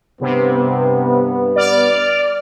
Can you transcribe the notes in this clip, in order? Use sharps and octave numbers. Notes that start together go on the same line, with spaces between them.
G2 C3 B3
D5 F6